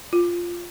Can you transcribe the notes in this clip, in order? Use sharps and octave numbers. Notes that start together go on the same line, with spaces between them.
F4